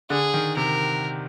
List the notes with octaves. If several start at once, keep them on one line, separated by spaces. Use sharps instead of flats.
D3 G#4
D#3
C3 A#4